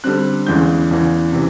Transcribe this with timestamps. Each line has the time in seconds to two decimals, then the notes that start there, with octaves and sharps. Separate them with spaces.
0.04 D3 G3 C4 F#6
0.47 E2 C#3 E3 G#3 C#4 G6
0.91 E2 C#3 E3
1.32 C3 E3